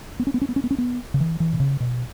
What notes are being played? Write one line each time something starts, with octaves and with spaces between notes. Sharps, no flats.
B3
C#4
B3
C#4
B3
C#4
B3
C#4
B3
C#3
E3
E3
B2
C#3
B2